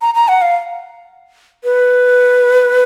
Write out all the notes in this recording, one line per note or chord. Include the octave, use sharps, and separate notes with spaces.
A#5
A#5
F#5
F5
B4